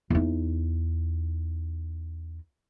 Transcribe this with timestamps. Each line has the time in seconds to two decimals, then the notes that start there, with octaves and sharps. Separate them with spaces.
0.10 E2 D#4